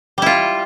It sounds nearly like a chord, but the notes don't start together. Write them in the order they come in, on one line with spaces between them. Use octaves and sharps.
G3 E4 F4